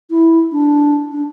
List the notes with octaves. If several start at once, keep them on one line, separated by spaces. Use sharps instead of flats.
E4
D4
D4